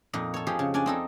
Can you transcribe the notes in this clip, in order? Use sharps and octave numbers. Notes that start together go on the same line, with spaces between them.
F2 A#2 D#4
A4 C#5
F3 G4 G#4
C#3
C#4 D4 D5 G#5
C4 D#4 A4